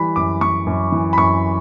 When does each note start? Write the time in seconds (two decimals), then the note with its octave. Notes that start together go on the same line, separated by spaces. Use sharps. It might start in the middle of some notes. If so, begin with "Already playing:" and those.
Already playing: E3 G3 B5
0.16 F#2 D6
0.41 E3 C#6
0.67 F#2
0.92 E3
1.13 B5
1.17 F#2 C#6